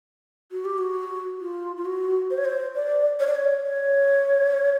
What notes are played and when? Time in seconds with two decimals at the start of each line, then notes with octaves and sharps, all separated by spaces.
0.52 F#4
0.65 G4
0.78 F#4
1.41 F4
1.77 F4
1.85 F#4
2.31 C5
2.38 C#5
2.45 C5
2.75 D5
3.20 C#5
3.27 D5
3.35 C#5
3.64 C#5